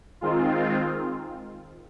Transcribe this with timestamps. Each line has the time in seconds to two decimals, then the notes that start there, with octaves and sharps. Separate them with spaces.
0.21 D#3 G#3 C4 F4